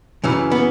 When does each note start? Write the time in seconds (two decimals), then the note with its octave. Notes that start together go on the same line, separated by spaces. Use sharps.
0.24 F#2 C#3 E3
0.52 B3